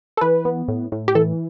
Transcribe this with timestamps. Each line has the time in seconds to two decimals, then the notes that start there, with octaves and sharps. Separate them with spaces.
0.17 A4
0.21 E3 B4
0.45 B3
0.68 A2
0.92 A2
1.08 G4
1.15 E3 A4